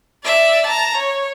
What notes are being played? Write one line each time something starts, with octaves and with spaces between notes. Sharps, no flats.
D5 E5
A5 A#5
C#5